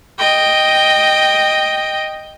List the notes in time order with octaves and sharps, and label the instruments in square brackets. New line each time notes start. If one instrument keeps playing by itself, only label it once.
[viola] D#5 G5